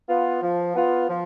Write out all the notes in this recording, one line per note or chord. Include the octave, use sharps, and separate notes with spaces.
B3 F4
F3
B3 F4
F3